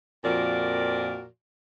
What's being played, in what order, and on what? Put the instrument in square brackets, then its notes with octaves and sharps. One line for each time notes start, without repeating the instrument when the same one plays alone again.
[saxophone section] F2 A#2 F3 F#4 A#4 D5